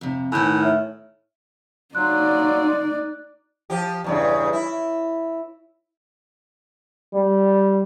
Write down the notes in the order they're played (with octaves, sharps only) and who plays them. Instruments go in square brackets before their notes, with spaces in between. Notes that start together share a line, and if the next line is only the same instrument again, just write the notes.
[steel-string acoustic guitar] F2 C3
[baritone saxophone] A2 [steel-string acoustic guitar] D#3 B3 [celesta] G#5 F#6 G6
[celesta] C#5 E5 F6
[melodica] F#3 F4 [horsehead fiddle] D#4 D5 [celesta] F#6
[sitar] F3 G4
E2 G2 C#3
E4
[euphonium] G3